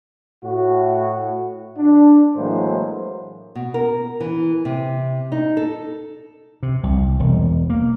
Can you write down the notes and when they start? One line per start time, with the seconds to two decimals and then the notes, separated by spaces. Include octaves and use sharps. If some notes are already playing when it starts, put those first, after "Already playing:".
0.44 A2 F#4
1.78 D4
2.36 A2 E3 F#3 G#3 A#3 C5
3.55 B2
3.74 A#4
4.20 E3
4.65 C3
5.32 D#4
5.57 A4
6.63 C3
6.83 C2
7.20 E1
7.70 A#3